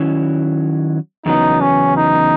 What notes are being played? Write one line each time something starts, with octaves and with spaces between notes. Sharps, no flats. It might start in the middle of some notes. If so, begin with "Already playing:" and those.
Already playing: D#3 F#3 C#4 E4
E2 C#3 F#3 B3 D#4
C#4
D#4